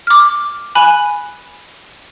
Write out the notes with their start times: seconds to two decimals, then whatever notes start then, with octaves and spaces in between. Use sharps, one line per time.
0.07 D6 F6
0.75 G#5 B5 F#6